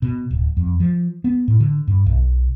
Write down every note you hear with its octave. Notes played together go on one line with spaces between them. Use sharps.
B2
D1
F2
F3
B3
A2
D3
G2
B1